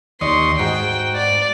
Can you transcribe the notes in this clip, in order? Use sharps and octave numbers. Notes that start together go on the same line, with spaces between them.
D#2 D5 D#5 C6 C#6
G#2 F#4 G5
D5